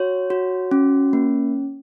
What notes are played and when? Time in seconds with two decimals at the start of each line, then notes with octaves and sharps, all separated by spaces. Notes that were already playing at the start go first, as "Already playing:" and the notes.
Already playing: F#4 C#5
0.30 F#4
0.71 C#4
1.13 A#3